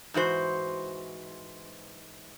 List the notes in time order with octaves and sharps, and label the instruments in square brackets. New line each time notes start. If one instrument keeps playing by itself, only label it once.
[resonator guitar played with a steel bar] G#2 E3 F#4 C5